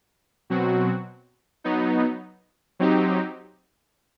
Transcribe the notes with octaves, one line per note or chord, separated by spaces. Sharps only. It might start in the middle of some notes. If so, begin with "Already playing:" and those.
B2 F#3 C4 F#4
F#3 B3 D#4
F#3 C4 D#4 G4